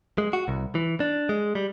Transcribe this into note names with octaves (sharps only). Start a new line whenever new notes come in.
G#3
F#4
C2
E3
D4
G#3
G3